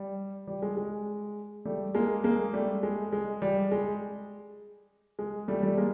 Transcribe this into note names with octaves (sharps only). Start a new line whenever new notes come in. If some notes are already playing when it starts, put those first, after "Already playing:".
Already playing: G3
G3
G#3
G#3
G3 A3
G#3 A#3
G#3 A#3
G3 A3
G#3
G#3
G3
G#3
G#3
G3 A3
G3 A3
G#3 A#3